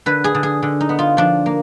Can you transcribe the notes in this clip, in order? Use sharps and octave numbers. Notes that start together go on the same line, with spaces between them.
D3 B4
G#4
D3
G#4
D3
D#4
B3
F4
F3 D4
A#3